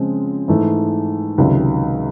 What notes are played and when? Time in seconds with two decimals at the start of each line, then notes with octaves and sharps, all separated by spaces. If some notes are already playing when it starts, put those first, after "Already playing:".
Already playing: C#3 F3 G#3 C4
0.48 G#2 E3 A3
1.38 C#2 C3 D#3 F#3